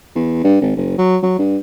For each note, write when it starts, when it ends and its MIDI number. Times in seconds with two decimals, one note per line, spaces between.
0.16 0.43 40
0.44 0.58 43
0.61 0.73 32
0.77 0.97 30
0.98 1.17 54
1.22 1.34 54
1.38 1.57 43